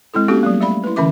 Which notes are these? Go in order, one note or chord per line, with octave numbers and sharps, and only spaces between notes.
G#3 C4 E4 A4
A#3 B3 C#4 F#4 G4 A4
F#3 G3 A#3
A3 D5 F5 B5
E4 B4
D3 E3 C#4 E5 D6